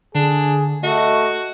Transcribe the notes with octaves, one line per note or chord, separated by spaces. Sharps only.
D3 D4 G#4
A3 F#4 D#5